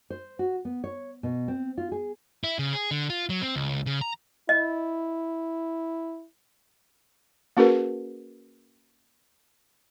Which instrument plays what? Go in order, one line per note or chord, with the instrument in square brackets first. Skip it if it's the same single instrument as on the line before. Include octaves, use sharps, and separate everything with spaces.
[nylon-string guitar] C5
F#4
B3
C#5
B2
C4
F4
G#4
[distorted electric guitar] E4
C#3
G#4
D3
F4
F#3
C4
C#2
C#3
A#5
[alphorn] E4 [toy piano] D#5
[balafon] A#3 C#4 F#4 G#4 A#4 B4